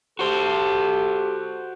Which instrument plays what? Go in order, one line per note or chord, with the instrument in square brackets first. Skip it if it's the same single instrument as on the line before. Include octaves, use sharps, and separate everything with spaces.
[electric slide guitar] F#4 C5 [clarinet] G4 [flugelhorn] A4